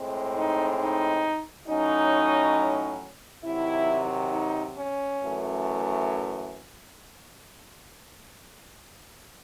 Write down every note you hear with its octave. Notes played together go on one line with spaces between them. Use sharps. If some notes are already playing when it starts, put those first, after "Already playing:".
Already playing: A2 G#3 C4
D#4
D#4
A2 F#3 C#4 D#4
C3 D#3 F#3 E4
D#4
C#4
F#2 E3 A3